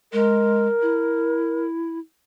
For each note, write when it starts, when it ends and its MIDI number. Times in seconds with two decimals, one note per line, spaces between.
0.13 0.67 56
0.13 1.64 70
0.82 1.99 64